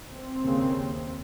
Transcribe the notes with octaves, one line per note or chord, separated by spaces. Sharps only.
C4
D#2 C#3